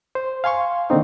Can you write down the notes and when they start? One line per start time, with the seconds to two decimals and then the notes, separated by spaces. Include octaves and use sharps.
0.15 C5
0.44 F5 G#5 C6 C#6
0.90 D3 D#3 A#3 C4 D#4